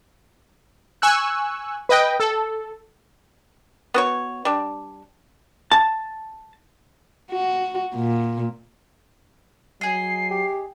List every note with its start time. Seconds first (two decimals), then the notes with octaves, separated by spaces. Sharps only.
1.02 G#5 C#6 E6 F#6
1.89 B4 D#5 G5
2.20 A4
3.94 B3 F#4 C#5
4.45 G3 D4
5.72 A5
7.31 F#4
7.95 A#2
9.81 F#3 G#4 D#5 C7
10.31 G4